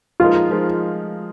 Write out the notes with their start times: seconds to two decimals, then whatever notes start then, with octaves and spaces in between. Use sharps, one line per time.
0.20 F3 G#3 D#4 F4 A#4
0.51 F3 G#3 D#4 A#4